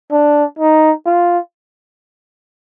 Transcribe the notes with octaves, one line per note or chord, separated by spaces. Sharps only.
D4
D#4
F4